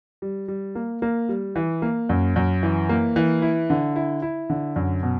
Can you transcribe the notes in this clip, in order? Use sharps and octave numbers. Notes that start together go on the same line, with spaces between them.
G3
G3
A#3
A#3
G3
E3
A#3
F#2
F#2
E3
A#3
E3
E4
D3
E4
E4
D3
F#2
B2